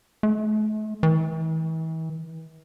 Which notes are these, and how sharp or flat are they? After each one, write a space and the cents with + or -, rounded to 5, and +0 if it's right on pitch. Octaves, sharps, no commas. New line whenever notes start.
A3 -40
E3 -40